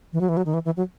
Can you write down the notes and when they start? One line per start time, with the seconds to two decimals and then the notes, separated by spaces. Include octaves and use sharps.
0.13 E3
0.21 F#3
0.29 E3
0.37 F#3
0.46 D#3
0.54 E3
0.65 E3
0.77 F#3